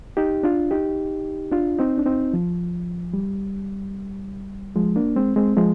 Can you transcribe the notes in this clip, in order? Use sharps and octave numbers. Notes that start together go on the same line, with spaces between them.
D#4 G4
D4 F4
D#4 G4
D4 F4
C4 D#4
D4
C4 D#4
F3
G3
F3 G#3
A#3 D4
G#3 C4
G#3 C4
F3 G#3